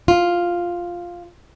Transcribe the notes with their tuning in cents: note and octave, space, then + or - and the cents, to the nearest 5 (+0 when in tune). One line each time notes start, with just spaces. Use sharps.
F4 +0